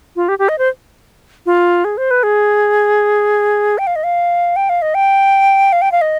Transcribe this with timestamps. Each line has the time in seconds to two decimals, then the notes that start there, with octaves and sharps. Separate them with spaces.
0.16 F4
0.29 G4
0.39 G4
0.49 D#5
0.58 C5
1.46 F4
1.85 G#4
1.98 C5
2.11 B4
2.23 G#4
3.78 G5
3.87 F5
3.96 D#5
4.04 F5
4.56 G5
4.69 F5
4.82 D#5
4.95 G5
5.73 F5
5.82 G5
5.92 F5
6.01 D#5